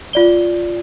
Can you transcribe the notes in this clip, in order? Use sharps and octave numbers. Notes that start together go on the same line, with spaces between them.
F4 D5 G7